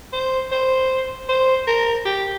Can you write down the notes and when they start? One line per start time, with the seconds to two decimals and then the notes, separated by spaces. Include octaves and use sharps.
0.13 C5
0.51 C5
1.29 C5
1.67 A#4
2.05 G4